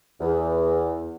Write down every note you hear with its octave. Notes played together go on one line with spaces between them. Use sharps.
E2